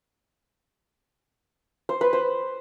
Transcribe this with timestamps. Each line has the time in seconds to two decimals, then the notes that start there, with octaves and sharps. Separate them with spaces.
1.89 C5
2.01 B4
2.13 C5